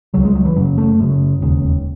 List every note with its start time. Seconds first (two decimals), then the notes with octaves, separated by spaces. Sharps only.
0.14 C#2 C#3 F#3
0.25 G#3
0.35 F#3
0.45 E3
0.56 F#1 F#2 C#3 F#3
0.78 A3
0.99 F#1 F#2 C#3
1.42 E1 D#2 C#3